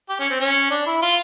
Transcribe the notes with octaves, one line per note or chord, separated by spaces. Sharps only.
G4
C#4
C4
C#4
D4
E4
F4